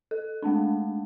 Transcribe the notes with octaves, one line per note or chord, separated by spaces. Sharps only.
A4
G#3 A3 C4 D4